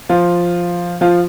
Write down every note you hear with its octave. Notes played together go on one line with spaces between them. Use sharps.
F3 F4
F3 F4